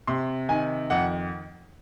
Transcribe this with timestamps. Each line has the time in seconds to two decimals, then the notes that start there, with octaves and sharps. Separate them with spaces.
0.07 C3 C6
0.49 D#3 G#5
0.90 F2 F#5